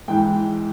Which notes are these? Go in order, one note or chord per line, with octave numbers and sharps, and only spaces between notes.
G#2 E3 G5